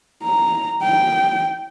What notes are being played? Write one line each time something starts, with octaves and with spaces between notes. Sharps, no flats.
A#5
G5